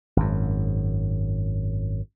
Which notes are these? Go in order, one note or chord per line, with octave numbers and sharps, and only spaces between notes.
G#1 F#2